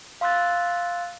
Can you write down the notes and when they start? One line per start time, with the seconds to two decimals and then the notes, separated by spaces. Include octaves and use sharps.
0.21 F5 C6 E6 F#6 A6